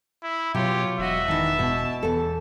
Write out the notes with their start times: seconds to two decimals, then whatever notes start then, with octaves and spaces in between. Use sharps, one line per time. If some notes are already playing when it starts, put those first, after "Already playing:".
0.23 E4
0.55 B2 F#3 F4 G4 C#5
0.99 E1 F#4 D#5 E5
1.28 D#3 E3 A5
1.59 B2
2.03 E2 A4